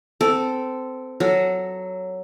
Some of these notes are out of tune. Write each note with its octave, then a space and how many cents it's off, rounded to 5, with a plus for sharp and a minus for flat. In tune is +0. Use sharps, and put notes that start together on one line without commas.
C4 -20 A4 +0
F#3 +0 A4 +0